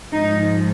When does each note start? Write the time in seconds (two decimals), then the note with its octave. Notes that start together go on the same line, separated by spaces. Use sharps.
0.11 G#2 F3 G#3 D#4